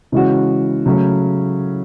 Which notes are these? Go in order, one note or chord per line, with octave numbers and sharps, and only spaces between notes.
C#3 E3 G#3 C#4 F#4
C#3 F#3 A3 C#4